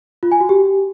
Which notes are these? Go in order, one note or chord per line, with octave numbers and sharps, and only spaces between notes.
F4
G#5
F#4
G4